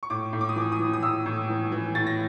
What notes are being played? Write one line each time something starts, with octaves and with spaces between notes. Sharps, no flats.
C#6
A2 D6
A2
D6
D#6
E3 D6
D#6
E3
D#6
A2 E6
A2
E3
E3
A2 A6
A#6